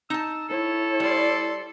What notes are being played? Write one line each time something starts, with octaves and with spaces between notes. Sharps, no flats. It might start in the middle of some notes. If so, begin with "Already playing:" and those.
D#4 A5 E6
E4 A4 C#5
G3 D5 C6